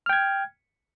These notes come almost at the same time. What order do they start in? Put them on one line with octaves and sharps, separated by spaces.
F6 G5 G#6